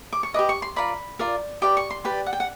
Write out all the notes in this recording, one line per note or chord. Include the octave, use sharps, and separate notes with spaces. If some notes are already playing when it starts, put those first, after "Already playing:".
D6
C#6
G4 B4 D#5 D6
C#6
C6
F4 A#4 D5 B5
F4 A#4 D5
G4 B4 D5 D6
C#6
C6
G4 B4 D5
F#5
G5
F#5